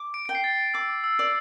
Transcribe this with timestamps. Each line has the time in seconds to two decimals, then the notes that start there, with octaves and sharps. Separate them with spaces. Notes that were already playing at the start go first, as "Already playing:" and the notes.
Already playing: D6
0.14 D7
0.25 G5 D7
0.35 C7
0.44 A6
0.74 D6 E6
1.04 E6
1.19 D5